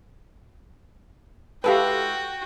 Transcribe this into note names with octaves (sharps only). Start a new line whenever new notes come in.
G#3 E4 F#4 G4 A4 B4 F5 G5